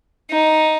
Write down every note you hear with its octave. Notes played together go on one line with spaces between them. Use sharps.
D#4